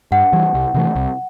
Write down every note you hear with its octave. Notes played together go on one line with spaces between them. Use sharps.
G2 F#5
E3 G3
C2
C3 E3 A3
C2